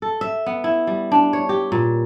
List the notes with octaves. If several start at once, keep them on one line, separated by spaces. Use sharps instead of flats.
A4
E5
B3
E4
G3
D4
C#5
G4
A#2